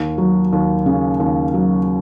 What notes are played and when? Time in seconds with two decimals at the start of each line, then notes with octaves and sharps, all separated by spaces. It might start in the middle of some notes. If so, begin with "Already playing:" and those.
Already playing: D#2
0.18 F#3
0.53 D#2
0.86 C#3
1.20 D#2
1.54 F#3